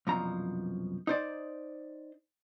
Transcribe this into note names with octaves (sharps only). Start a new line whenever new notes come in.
C2 F#2 B2 F3 A#5
D#4 C5 D5